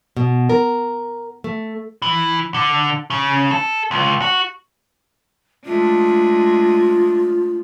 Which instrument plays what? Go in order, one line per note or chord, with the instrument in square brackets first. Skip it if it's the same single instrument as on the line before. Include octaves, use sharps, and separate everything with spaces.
[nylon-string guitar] B2
A#4
A3
[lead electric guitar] E3
D3
C#3
A4
C#2
F#4
[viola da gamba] G#3 A3 D4 [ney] F4